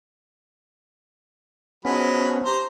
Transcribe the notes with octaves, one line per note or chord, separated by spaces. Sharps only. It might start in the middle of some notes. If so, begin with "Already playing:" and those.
F3 F#3 G#3 B3 C#4 D#4 B5
A3
G4 C5 A#5